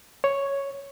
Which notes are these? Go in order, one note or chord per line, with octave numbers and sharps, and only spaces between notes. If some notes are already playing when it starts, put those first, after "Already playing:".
C#5